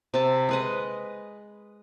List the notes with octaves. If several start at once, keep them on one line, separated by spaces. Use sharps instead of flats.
C3 E5 A5
G#3 B4 D#5